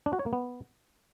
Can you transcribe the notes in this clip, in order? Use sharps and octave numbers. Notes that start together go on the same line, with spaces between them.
D4
F#4
C#5
A#3
B3